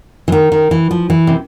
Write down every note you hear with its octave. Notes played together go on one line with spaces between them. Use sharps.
E3
D#3
D#3
E3
F3
E3
C3